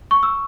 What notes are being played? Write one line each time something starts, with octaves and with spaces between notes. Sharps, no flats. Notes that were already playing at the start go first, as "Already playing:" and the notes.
C#6
E6